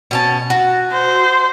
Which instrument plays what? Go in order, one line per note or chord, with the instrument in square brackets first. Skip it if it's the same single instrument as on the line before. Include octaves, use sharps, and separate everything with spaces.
[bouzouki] B2 C#4 A5
F#4
[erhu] C5